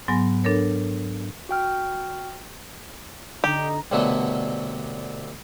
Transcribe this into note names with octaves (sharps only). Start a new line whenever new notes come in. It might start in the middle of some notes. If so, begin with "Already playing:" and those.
G#2 F#3 B3 G#5 A#6
D4 A4 A#4 C#5
F#4 G5 F6
D3 D#4 G4 A#5
C2 B2 D3 F#3 A3 B3